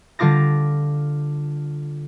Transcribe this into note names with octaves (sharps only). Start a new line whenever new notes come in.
D3 G3 F4 D6 A#6